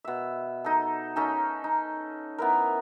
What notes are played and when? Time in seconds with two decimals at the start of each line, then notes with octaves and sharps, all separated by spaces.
0.05 B2 E5
0.64 D#4 A4
1.16 C#4 D#4 A4
1.64 D#4
2.38 B3 E4 A#4